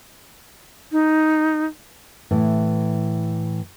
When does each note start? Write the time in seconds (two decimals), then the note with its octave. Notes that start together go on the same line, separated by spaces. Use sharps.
0.92 D#4
2.31 A2 E3